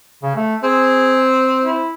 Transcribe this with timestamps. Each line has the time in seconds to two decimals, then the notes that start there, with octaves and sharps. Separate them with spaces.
0.23 C#3
0.35 A3
0.63 C4 G#4
1.62 E4